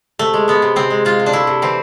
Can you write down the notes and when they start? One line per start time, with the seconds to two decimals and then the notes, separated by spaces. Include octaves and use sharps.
0.19 C3 A3
0.34 G#3
0.48 G#3 B3
0.62 C3
0.76 C3 C4
0.90 G#3
1.05 G#3 F4
1.20 C3
1.26 D4
1.33 A3 E4
1.47 C3
1.62 E3 C4